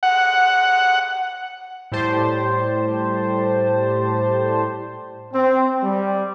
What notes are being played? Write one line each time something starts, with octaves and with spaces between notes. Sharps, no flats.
F#5
A2 G3 G4 C5 A5
C4
G3